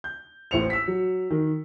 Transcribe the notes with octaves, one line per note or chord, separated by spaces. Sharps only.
G6
A1 A2 C5 C#7 F7
E6 B6
F#3
D#3